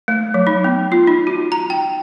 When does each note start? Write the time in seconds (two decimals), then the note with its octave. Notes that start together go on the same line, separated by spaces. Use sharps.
0.08 A3
0.34 F#3
0.47 D#4
0.64 B3
0.92 F4
1.07 D#4
1.27 F#4
1.52 A#5
1.70 G5